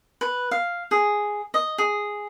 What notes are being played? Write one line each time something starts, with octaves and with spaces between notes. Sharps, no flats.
B4
F5
G#4
D#5
G#4